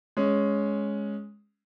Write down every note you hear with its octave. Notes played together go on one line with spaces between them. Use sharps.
G#3 C#4